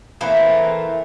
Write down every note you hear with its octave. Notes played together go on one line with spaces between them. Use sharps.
E3 A3 A#3 C4